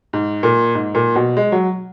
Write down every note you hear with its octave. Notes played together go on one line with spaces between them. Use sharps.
G#2
A#2
G#2
A#2
B2
G#3
F#3